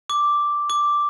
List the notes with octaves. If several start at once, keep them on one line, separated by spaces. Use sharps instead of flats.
D6
D6